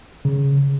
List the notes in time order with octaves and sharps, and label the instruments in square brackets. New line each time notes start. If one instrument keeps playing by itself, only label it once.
[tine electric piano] C#3